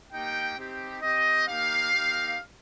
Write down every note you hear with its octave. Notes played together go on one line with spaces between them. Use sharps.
A#3 D#4 G4 G5
C4 D#4 G4
C4 G4 D#5
A#3 D#4 G4 F5
A#3 D#4 G4